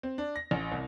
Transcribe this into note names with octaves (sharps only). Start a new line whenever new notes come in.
C4
D4
A#6
A1
C2